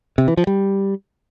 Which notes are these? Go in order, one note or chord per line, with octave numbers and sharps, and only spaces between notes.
C3
E3
F3
G3